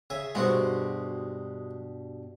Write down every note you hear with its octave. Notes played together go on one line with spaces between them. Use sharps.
C#3 E5 G#5
G2 B2 G#3 F#4 G4 C5